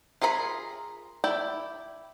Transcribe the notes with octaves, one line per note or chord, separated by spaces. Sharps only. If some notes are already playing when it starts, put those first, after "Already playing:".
F4 G#4 A#4 F5 B5
E4 D5 G5